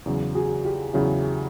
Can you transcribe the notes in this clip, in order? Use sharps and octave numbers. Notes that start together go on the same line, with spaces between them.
E2 C#3 F#3
F#4 G#4
F4 G4
E2 C#3 F#3 E4 F#4